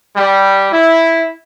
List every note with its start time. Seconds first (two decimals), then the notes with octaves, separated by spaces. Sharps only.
0.16 G3
0.71 E4